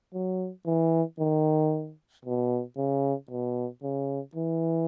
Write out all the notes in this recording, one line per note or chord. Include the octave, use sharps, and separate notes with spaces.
F#3
E3
D#3
B2
C#3
B2
C#3
E3